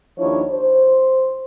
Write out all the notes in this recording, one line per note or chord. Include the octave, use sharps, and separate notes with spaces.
D#2 F3 D4 E4 C#5
C5